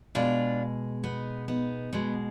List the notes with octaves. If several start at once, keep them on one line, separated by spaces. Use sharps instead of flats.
B2 G#3 D4 F4
B3 D#4
B3 D#4
B2 G#3 B3